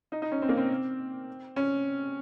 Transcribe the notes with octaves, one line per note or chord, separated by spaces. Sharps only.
D#4
D#4
C#4
C4
A#3
C4
C#4